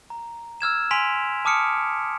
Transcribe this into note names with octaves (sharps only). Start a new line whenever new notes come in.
A#5
E6 F6 G#6 E7
G#5 C6 B6 D7 F7
A5 D6 D#6 F6 C#7 D7